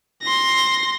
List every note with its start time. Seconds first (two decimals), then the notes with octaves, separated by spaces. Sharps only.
0.23 C6 A#6